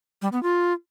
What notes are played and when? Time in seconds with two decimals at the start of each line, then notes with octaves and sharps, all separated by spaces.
0.22 G3
0.32 B3
0.43 F4